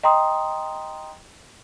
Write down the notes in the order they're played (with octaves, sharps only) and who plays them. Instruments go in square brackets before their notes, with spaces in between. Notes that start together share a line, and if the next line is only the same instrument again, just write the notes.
[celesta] D#5 G5 A#5 C6 D#6